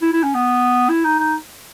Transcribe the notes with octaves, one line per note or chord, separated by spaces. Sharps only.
E4
E4
C#4
B3
E4
D#4
D#4